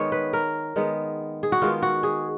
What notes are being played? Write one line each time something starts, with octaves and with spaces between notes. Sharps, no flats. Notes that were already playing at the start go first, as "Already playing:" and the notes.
Already playing: D#3 G#3 B3 C#5
B4
A#4
D#3 G#3 B3
G#4
F#4
D#3 G#3 B3 F4
F#4
G#4